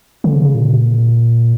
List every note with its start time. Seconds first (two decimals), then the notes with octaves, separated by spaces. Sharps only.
0.24 D3
0.36 C#3
0.55 A#2